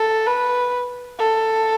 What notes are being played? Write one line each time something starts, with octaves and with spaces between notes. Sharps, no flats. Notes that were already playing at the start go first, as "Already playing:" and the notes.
Already playing: A4
B4
A4